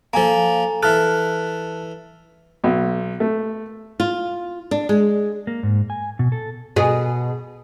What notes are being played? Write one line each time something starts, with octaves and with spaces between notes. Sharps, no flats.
F3 A#3 A4 G#5 A#5
E3 A4 A5 F6 F#6
B1
A3
F4
D4
G#3
A#3
G#2
G#5
B2
A4
B2 G#4